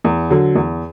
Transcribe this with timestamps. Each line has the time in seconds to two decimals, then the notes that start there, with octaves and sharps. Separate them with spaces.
0.04 E2
0.30 D3 F#3
0.55 E2